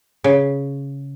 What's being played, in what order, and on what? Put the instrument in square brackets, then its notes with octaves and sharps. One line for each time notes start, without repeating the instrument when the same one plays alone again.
[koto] C#3